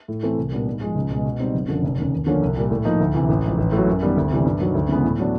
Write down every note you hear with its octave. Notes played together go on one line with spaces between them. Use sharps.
A2
E3 A3 C4
C2
A#2 G3 B3 D4
G#2
F3 G#3
C#2
B2 G#3
B2
G3 C4 D#4
F#1
F#2 D3 F3
F1
D#2 C#3
D#2
D3 F3 A#3 C#4
C2
A#2 G3
A2
F3 A#3 D#4
D2
C3 E3
A1
G#2 F3
A1
A2
F#3
F#2
D#3 G3 B3
D2
C3 E3 G3
G2
D#3 F#3
D2
C#3 E3 G#3 B3
A2
F#3 B3 D4